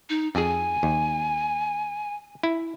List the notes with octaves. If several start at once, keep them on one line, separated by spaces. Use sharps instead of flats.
D#4
F2 G#4 G#5
D#2
E4